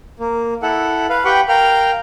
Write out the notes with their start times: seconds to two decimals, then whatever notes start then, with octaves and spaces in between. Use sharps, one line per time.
0.20 A#3
0.63 E4 A4 F#5
1.09 B4 F5
1.25 G4 B4 F#5 G5 B5 C#6
1.48 A#4 F5 G5 F6